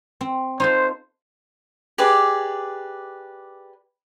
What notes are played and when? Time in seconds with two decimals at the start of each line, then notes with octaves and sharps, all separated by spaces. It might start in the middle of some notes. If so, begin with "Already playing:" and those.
0.21 C4
0.60 D#4 F4 A4 C5
1.98 G4 G#4 B4 D5